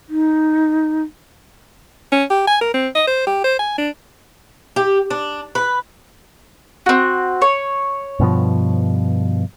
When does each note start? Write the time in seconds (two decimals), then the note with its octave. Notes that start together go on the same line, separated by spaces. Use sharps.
0.09 D#4
2.12 C#4
2.30 G4
2.47 G#5
2.61 A#4
2.74 C4
2.95 D#5
3.07 C5
3.27 G4
3.44 C5
3.59 G#5
3.78 D4
4.76 G4
5.10 D4
5.55 B4
6.86 C4 F#4
7.42 C#5
8.20 G2 B2 F3